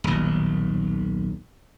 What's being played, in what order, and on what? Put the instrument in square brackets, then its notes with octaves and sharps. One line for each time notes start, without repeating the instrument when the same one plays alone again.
[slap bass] D#1 B1